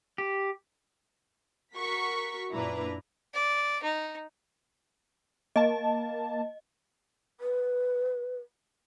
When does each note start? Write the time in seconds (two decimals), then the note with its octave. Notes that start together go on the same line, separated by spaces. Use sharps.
0.18 G4
1.76 F#4 A#4 C#6 B6
2.52 F#2 A#2 D4 E4 B4 A#5
3.34 D5
3.84 D#4
5.56 A#3 D#5 A5
7.40 B4